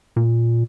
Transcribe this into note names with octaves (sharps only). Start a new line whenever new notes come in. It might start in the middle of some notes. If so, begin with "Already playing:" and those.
A#2